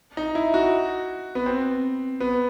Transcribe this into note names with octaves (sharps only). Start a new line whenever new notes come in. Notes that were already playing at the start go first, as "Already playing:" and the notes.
D#4
E4
F#4
B3
C4
B3